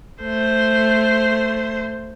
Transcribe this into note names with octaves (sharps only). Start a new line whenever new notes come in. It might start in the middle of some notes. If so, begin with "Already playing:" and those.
A3 C5